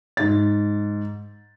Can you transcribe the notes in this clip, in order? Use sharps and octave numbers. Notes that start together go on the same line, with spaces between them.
G#2 A6